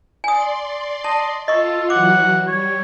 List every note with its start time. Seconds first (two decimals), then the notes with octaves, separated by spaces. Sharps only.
0.24 D5 G#5 C6 D#6
1.04 D#5 A5
1.48 F4 A4 D#5 C#6
1.90 E3 F#3 F#4 F#5 D6
2.47 G3 C#5